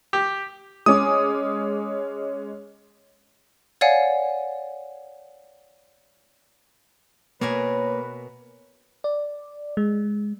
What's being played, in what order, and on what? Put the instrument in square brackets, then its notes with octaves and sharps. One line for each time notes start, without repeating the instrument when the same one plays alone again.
[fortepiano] G4
[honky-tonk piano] G#3 C#4 D6 [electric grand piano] D#6
[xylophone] C#5 D5 F5 F#5 G#5
[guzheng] B2 A#4 G#5 [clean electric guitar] A#3 [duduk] B4 [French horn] C#5
[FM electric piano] D5
G#3